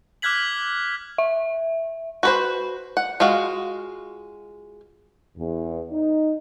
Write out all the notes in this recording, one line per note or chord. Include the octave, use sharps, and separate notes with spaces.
D6 F6 F#6 G#6 B6 F#7
E5
F#4 B4 C5
F#5
G#3 F4 F#4 F5
E2
D#4